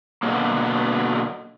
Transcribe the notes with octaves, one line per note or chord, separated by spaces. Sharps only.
B2 D3 D#3 F#3 A#3